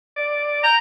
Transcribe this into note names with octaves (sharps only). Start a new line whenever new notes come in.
D5
G5 A#5